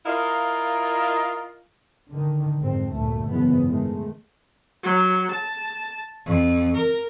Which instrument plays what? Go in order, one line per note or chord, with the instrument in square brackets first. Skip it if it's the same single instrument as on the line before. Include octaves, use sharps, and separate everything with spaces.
[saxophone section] E4 F4 A#4 D#5 F5
[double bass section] D3 D#3
F2 G#2 C4
G1 D2 A#2 A3
F#1 G#2 B2 E3 F3 B3
D#3 G#3 A3
[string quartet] F#3
A5
F2
A#4